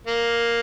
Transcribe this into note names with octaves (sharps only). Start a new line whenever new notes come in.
A#3